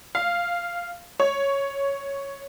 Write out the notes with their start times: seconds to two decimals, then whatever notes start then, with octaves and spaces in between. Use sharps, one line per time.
0.15 F5
1.20 C#5